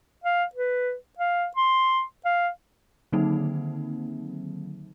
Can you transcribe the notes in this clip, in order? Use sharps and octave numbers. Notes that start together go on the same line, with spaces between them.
F5
B4
F5
C6
F5
D3 D#3 F#3 A#3 C4 D#4